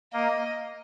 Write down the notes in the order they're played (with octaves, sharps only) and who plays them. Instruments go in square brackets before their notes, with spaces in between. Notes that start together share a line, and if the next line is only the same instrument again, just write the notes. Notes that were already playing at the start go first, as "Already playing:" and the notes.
[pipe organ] A#3 [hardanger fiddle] D#5